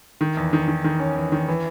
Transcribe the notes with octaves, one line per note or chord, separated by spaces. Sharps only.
D#3
E2
D#3
D#3
D#3
C#4
E2
D#3
E3